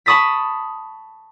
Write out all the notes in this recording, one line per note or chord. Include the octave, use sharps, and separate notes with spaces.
A5 B5 C#6 D#6 A6 B6